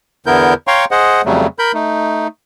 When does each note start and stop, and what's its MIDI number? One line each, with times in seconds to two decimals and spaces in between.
0.26 0.54 40
0.26 0.54 50
0.26 0.54 59
0.26 0.54 64
0.26 0.54 70
0.26 0.54 91
0.67 0.85 73
0.67 0.85 77
0.67 0.85 79
0.67 0.85 82
0.67 0.85 84
0.67 0.85 85
0.91 1.22 68
0.91 1.22 72
0.91 1.22 75
0.91 1.22 78
1.25 1.47 41
1.25 1.47 49
1.25 1.47 54
1.25 1.47 55
1.25 1.47 57
1.59 1.72 70
1.59 1.72 83
1.59 1.72 91
1.74 2.27 57
1.74 2.27 63